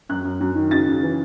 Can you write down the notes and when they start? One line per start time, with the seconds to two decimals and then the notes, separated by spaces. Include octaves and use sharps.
0.09 F#2 F#6
0.24 F#2
0.40 F#2
0.55 D#3
0.71 C#3 A6
0.88 C#3
1.03 E3